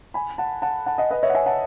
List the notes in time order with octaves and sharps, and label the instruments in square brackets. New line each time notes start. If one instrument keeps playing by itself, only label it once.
[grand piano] G#5 B5
F#5 A5
F#5 A5
F#5 A5
D#5 F#5
B4 D#5
C#5 E5
F#5
E5 G#5
F#5 A5